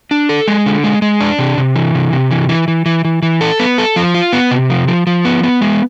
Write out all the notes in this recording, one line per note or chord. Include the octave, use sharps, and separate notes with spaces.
D4
A4
G#3
D3
G#3
G#3
D4
C3
C3
E3
C3
C3
E3
E3
E3
E3
E3
E3
A4
B3
A4
F3
F4
B3
C3
F3
F3
F3
B3
B3
G#3